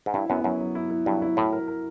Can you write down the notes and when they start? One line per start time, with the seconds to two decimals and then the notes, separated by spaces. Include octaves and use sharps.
0.06 G#2
0.14 G2 E4
0.30 F#2 B3
0.44 F#2 F#3
0.61 F#3
0.75 E4
0.90 E4
1.06 G2 F#3
1.22 E4
1.37 A2 F#4
1.53 A#4
1.68 A#4